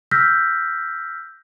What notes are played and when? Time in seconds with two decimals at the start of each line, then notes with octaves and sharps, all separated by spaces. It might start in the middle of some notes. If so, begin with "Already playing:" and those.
0.11 E6 F6 G6 A#6 B6